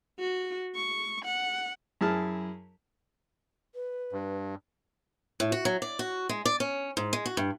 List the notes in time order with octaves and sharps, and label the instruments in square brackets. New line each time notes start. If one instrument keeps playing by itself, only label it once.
[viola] F#4
C#6
F#5
[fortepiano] F#2 E4 G#4 A5 F6
[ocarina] B4
[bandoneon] G2
[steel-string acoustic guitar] A2
F#4
F#3
D5
F#4
G#3
D5
C#4
G#2
G#3
F#4
G2